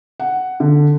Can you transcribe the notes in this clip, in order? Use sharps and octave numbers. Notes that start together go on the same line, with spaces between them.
F#5
D3